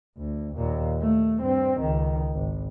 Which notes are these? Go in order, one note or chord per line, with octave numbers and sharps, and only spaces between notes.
D2
D#2 A#2
A3
G2 C4
C#2 D#3
G#1